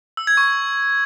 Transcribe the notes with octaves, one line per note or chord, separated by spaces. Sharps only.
E6
G#6
C#6